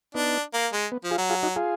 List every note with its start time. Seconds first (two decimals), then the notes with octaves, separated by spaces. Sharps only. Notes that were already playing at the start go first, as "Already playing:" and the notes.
0.14 B3 D4 D#4
0.54 A#3
0.73 G#3
0.92 B3
1.04 F3
1.11 F4 G#4
1.18 F#3
1.30 F4 G#4
1.43 D#4 F#4
1.56 F4 G#4